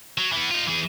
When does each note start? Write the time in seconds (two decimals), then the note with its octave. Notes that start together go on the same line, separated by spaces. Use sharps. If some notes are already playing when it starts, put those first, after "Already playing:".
0.18 F#3
0.33 E3 B3
0.51 D#4 F4
0.67 E3 G#4